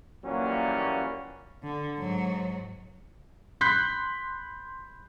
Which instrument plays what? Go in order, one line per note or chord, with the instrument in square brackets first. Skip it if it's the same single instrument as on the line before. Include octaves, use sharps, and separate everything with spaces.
[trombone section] A#2 E3 F#3 G3 A#3 C#4
[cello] D3
G#2 F#3
[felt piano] B5 C6 F#6 G6 B6 C7